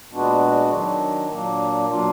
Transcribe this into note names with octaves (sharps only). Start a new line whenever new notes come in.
A#2 G#3 B3 D4 F#4
D#3 F#3 D4
A#2 F#3 A#3 D4
B2 F#3 A#3 D4 F4